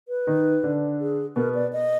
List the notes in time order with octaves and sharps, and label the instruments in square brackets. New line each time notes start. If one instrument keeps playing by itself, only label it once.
[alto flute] B4
[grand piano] D#3 D#4
D3 D4
[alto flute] G#4
[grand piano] B2 B3 [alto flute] A#4
[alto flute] D5
D#5